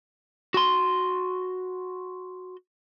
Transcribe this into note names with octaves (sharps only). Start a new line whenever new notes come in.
F#4 C6